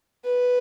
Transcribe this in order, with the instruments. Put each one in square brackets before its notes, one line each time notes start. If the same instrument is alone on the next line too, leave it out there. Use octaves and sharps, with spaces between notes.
[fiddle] B4